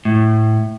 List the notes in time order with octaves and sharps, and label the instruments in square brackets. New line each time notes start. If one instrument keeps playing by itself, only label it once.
[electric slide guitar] A2